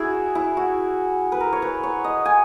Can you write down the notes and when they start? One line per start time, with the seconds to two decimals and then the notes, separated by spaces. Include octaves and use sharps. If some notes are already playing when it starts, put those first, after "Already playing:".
Already playing: E4 F#4 G#4
0.35 E4
0.57 F#4
1.32 B4
1.40 A#4
1.53 C#5
1.62 B4
1.83 C#5
2.04 D#5
2.25 G#5